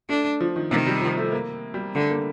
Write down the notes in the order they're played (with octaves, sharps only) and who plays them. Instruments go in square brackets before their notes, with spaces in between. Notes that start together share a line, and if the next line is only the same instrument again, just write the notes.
[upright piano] A3 [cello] D4
[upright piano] F3
D#3
[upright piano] C3 [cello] D#3
[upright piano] G3
F3
A3
A#3
G3
[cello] D3 [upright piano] A3
[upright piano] A#3